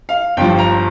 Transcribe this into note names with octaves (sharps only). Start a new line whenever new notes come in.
F5
G1 G2 F3 G5
A#5